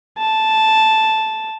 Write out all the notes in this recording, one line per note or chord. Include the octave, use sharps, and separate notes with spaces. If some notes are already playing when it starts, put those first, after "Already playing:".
A5